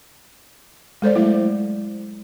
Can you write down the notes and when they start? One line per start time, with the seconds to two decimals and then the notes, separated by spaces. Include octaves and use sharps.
1.02 G#3 A4 C5 D5
1.16 F#3 A3 E4